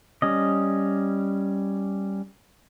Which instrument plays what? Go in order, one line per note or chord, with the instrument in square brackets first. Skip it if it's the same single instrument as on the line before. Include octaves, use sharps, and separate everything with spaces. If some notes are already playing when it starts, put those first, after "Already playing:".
[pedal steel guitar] G3 C#4 D#5